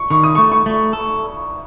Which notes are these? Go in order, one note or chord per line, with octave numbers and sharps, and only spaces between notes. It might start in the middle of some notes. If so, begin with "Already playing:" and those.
Already playing: C#6
D#3 C#6
D#6
A3 C#6
C#6
A3
A4